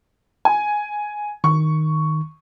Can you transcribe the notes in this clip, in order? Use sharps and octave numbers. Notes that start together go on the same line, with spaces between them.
G#5
D#3 C#6